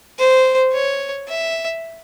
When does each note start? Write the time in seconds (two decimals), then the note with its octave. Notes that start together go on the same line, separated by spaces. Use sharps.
0.19 C5
0.73 C#5
1.28 E5